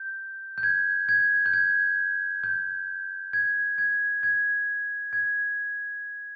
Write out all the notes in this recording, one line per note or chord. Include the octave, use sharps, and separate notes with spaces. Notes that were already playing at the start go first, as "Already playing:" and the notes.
Already playing: G6
G6
G#6
G#6
G6
G#6
G6
G#6
G#6
G#6
G#6